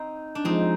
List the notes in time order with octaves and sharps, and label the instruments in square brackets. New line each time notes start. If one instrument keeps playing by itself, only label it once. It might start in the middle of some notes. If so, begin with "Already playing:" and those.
Already playing: [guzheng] C4 D#4
D4
[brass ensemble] F3 G#3 [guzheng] C4 D#4